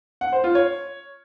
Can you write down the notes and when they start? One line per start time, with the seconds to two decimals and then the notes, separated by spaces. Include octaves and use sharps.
0.21 F#5
0.32 C5
0.44 F4
0.55 C#5